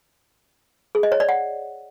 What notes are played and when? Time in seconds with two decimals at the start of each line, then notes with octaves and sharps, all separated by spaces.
0.95 G#4
1.03 D#5
1.12 C#5
1.20 D5
1.29 F#5